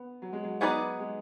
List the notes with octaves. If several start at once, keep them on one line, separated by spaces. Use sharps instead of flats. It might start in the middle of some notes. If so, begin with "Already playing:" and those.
Already playing: B3
F#3
G#3
F#3
F#3 B3 D#4 G#4 B4 D5
G#3